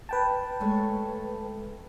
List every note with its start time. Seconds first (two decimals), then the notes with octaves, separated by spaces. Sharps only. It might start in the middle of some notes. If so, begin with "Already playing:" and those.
0.09 B4 G5 A5
0.60 G#3 A3 C#5